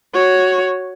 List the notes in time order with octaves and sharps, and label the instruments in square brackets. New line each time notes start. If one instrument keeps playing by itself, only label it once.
[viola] F#4 C#5